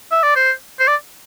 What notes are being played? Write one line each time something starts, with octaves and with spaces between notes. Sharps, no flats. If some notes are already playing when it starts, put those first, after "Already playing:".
E5
D5
C5
C5
D5